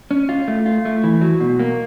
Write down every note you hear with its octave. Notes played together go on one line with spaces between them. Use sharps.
C#4
F4
A3
F4
A3
E3
F#3
B2
A#3